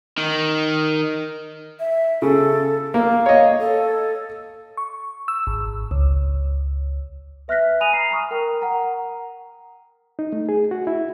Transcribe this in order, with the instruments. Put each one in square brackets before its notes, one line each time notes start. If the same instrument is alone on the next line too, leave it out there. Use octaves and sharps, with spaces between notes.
[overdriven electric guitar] D#3
[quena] E5
[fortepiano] C#3 [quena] A4
[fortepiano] A#3 [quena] F5
[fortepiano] C#5 D#5
[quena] A4
[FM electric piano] C#6
E6
G#1
C#2
[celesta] B4 E5 F6 F#6 A#6 B6
G#5 B5 D#6 F#6 D#7 F7
A#5 B5 C7
A#5 B5 C#6 D#6 F6
A#4 G5
F#5 A#5
[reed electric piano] D#4
A3
G#4
F#4
E4